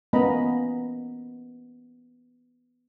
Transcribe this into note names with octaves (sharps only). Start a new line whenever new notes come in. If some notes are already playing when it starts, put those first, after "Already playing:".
A#3 B3 C#4 D#5 A#5 B5